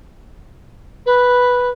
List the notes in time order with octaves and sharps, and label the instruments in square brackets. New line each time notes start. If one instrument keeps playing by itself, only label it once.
[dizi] B4